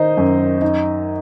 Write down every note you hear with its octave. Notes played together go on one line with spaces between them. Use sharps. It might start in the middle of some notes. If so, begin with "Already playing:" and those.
Already playing: D#3 D#4 C5 D#5
F#2
D#4